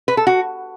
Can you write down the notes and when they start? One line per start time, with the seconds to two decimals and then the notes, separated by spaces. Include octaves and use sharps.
0.08 B4
0.17 A4
0.27 F#4